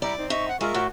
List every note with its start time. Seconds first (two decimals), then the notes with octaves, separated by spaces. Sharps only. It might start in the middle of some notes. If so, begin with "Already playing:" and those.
0.02 G3 E4 D5 A#5
0.18 C4 D#4
0.30 D#4 E5 C#6
0.48 F#5
0.61 G#3 F4 A#4 E5 C#6
0.74 A2 F#4